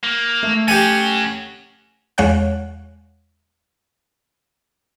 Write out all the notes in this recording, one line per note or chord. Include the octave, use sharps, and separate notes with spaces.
A#3
A3
C#4 F#4 G4 G#5
E2 G#3 C#5 F5 F#5 F#6